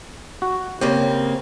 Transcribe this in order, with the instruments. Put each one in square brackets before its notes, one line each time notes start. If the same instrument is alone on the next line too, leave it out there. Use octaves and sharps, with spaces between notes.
[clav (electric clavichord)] F#4
[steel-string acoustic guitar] C#3 A#3 C4 [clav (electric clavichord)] G4